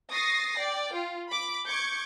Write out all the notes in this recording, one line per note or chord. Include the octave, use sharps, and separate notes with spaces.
C#6 D#6 A6 A#6 C7
D5 G5
F4
B5 D6
C#6 D6 G6 G#6 C#7